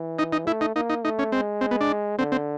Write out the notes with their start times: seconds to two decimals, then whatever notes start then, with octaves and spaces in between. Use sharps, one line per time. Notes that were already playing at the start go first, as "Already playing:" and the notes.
Already playing: E3
0.19 D#4
0.33 D#4
0.47 A3 E4
0.61 D#4
0.76 A#3 D#4
0.90 D#4
1.04 A3 D#4
1.19 C#4
1.32 G#3 C4
1.61 C4
1.71 B3
1.81 D4
2.18 D3 C4
2.32 C4